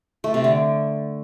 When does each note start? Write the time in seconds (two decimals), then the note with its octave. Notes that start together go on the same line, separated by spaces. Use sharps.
0.24 A3
0.34 C3
0.44 D3